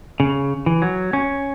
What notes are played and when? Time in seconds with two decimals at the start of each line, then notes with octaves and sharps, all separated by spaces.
0.20 C#3
0.66 E3
0.82 F#3
1.13 C#4